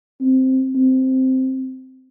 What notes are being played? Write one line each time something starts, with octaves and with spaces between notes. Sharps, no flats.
C4
C4